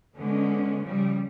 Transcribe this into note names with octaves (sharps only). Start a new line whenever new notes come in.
D3 G#3 B3 C#4
C#3 F3 G3